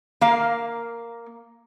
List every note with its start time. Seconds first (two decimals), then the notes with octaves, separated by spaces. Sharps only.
0.21 A#3 F5